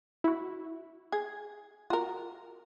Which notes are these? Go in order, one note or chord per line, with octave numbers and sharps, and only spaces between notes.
E4 F#4
G#4 G#6
F4 F#4 A#4